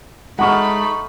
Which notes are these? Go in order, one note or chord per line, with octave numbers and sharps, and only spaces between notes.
G#3 A3 D#4 F#5 B5 C#6 F6